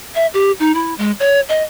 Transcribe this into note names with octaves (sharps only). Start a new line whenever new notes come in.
E5
G4
D#4
E4
G#3
C#5
D#5